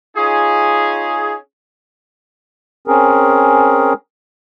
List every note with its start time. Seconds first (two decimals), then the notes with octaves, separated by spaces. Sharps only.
0.17 C#4 D#4 F4 G#4
2.87 C4 C#4 G#4 A#4